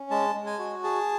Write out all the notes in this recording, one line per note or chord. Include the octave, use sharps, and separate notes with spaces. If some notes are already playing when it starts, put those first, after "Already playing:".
Already playing: C#4
G#3 A5
G#3
G#5
F#4
G#4 A5